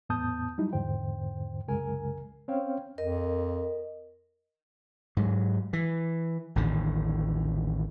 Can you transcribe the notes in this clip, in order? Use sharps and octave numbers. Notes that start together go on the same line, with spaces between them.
E2 A2 B3 A5 D#6 G6
F#3 G3 D#4 E4
E2 G#2 D3 C5 G5
C2 F#2 C#3 G#3 A#4 G#5
C4 C#4 C5 C#5 F5 G5
F2 A#4 D#5
G#2 F#3
E3
A1 D#2 A2 D3